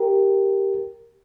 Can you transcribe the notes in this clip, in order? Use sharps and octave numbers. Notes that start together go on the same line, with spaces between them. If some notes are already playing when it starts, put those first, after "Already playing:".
Already playing: G4 A#4